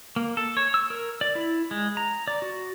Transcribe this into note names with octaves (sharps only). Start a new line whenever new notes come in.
A#3
A4
C#5
E6
A#4
D5
E4
G#3
A#5
D5
F#4